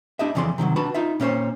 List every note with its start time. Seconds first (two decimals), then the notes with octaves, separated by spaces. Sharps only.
0.19 D4 E4 G4 D#5 E5
0.35 F2 C#3 E3 D5 C6
0.58 C3 D#3 F3 F#3
0.76 D4 F#4 B4 A5 B5
0.94 D#4 F4 E5
1.20 A#2 C#4 D#4 C5 C#5